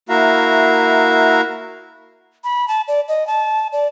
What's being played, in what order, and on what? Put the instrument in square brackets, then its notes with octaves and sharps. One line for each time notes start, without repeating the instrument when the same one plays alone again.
[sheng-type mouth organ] A#3 E4 F#4 E5 F5 A#5
[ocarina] B5
A5
D5
D#5
A5
D5